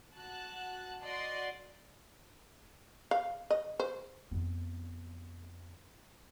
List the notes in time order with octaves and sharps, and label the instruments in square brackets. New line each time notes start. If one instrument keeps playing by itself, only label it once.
[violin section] F#4 A5 F#6
F#4 D5 D#5 C6
[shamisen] F5
D#5
C5
[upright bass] F2 B3